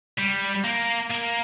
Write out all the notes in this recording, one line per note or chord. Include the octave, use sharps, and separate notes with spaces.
G3
A#3
A#3